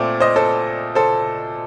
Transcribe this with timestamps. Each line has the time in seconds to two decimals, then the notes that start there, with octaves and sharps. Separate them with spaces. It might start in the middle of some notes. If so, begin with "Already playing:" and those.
Already playing: A#2 A3 C4 D5
0.20 C5 D#5
0.36 A4 C5
0.95 A4 C5